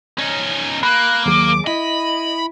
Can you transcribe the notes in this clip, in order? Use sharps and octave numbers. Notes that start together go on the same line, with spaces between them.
C#4 D#4
A#3 B5 F#6
D#2 F#3 G#4 D6
E4 D#5 B5